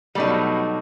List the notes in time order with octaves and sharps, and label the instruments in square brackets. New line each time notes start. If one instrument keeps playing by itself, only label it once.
[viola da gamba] B2 F#3 [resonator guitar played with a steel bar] G3 A3 D#4